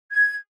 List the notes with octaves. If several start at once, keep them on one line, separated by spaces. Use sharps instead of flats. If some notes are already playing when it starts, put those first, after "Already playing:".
G#6